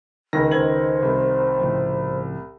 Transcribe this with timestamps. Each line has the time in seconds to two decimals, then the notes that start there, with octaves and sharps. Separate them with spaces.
0.33 C#2 D#3 A#6
0.51 C#2 C5 G#6 F#7
1.02 C2
1.60 A2 C#3 F3